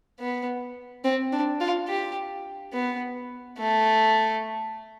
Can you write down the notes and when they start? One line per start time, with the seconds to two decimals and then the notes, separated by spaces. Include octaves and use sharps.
0.20 B3
1.04 C4
1.32 D4
1.61 F4
1.88 G4
2.73 B3
3.58 A3